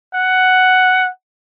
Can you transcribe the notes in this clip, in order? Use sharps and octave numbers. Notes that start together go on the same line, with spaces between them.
F#5